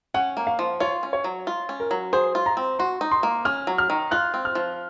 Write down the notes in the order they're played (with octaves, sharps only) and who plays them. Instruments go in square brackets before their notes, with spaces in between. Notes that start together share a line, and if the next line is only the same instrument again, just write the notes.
[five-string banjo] C#4 [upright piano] F#5
[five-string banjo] A#3
[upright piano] F5
[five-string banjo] F3
[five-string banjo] F4 [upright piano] C#5
[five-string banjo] C#4
[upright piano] C#5
[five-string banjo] F#3
F4
C#4
[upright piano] A#4
[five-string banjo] F#3
[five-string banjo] G#4 [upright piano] C5
[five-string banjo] F4
[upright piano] A#5
[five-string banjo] C4
[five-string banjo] F#4 [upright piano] C6
[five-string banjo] D#4
[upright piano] C6
[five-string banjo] A#3
[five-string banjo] C#4 [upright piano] F6
[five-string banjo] F#3
[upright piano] F6
[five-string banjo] D#3
[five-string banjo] F4 [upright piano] F#6
[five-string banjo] C4
[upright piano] F6
[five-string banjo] F3